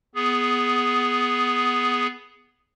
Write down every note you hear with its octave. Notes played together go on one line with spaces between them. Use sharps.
B3 G#4